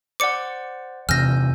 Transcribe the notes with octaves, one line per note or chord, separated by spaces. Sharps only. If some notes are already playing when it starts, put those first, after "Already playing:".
C5 D5 F#5 D6 C#7
E2 C3 G#5 E6 F6 G6 A#6